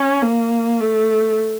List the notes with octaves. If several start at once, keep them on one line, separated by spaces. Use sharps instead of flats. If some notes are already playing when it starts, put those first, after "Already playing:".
Already playing: C#4
A#3
A3